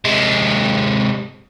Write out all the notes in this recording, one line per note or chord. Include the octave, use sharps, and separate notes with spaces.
C3 G#3